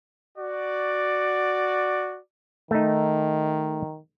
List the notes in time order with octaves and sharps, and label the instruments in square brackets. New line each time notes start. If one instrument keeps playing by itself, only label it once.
[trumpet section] F#4 D5
[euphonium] D#3 [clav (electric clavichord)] A3 D#4